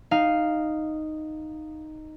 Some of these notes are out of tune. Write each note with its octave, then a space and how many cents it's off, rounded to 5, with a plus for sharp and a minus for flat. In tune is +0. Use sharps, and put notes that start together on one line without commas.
D#4 -5 F5 +0